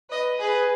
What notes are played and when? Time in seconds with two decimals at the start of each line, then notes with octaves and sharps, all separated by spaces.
0.10 B4 D#5
0.39 G#4 B4